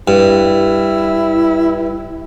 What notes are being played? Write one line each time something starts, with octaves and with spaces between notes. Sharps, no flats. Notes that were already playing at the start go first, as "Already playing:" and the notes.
G2 E4